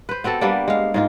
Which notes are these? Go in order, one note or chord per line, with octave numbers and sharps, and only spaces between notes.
B4 C5
B3 C4 F#4 A4
G3 A#3 B3 D4
G#3 F5
G#2 G#3 F4